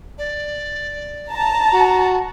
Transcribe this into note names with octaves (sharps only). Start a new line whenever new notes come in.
D5
A5 A#5
F#4